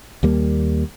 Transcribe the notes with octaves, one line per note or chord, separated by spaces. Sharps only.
D#2 G3 A#3